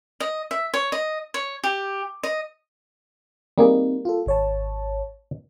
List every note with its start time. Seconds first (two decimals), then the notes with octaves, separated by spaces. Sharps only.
0.20 D#5
0.51 E5
0.74 C#5
0.92 D#5
1.34 C#5
1.64 G4
2.23 D#5
3.58 G3 A#3 C4 D#4 G#4
4.05 F4 A4
4.26 G#1 C#5 A5